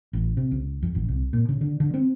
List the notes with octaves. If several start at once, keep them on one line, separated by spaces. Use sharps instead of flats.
A1
C3
C#2
F2
A1
C2
A#2
C#3
D3
D3
C4